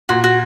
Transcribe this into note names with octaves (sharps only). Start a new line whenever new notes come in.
A#2 F#4
F#4